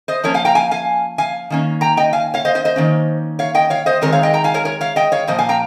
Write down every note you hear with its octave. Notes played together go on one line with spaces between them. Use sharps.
C5 D#5
F3 A#3 C#4 A#4 C#5
F5 G#5
G5 A#5
F5 G#5
F5 G#5
F5 G#5
D#3 A#3 C#4
G5 A#5
D#5 G5
F5 G#5
C#5 F5
C5 D#5
C5 D#5
C5 D#5
D#3 A#3 C#4
C#5 F5
D#5 G5
C#5 F5
C5 D#5
D#3 G#3 C4 A#4 C#5
C#5 F5
D#5 G5
G5 A#5
F5 G#5
A#4 C#5
A#4 C#5
C#5 F5
D#5 G5
C#5 F5
A#2 F3 A#3 C5 D#5
F5 G#5
G5 A#5